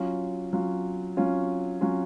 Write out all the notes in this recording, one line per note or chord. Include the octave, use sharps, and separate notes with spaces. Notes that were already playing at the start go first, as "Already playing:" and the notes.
Already playing: F#3 C#4 F4
F#3 C#4 F4
F#3 C#4 F4
F#3 C#4 F4